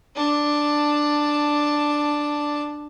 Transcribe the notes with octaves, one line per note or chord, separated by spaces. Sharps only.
D4 A5